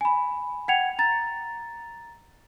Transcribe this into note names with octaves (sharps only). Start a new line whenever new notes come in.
G#5 B5
F#5 G5 G#6 C#7 F7
A#5 A6